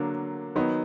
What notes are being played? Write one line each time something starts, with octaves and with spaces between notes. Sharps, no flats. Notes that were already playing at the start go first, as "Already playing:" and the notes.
Already playing: D3 F#3 A#3 D4
D#3 F#3 B3 D#4